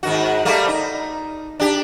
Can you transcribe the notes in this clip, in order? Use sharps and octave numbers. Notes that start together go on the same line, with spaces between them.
G#2 D#3 F#4
G3 A3 A#3
D#4
D4 G4